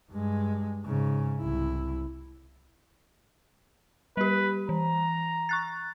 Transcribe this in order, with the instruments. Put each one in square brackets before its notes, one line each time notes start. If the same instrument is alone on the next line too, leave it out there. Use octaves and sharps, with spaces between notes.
[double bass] G2 G#3
G#2 C#3
C2 E4
[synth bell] G3 G4 [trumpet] B4
[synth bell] E3 [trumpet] A#5
[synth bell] C#6 F#6 A6